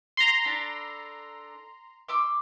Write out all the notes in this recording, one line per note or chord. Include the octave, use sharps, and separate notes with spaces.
A#5 C6
D4 A4 B5
C6 D6 E6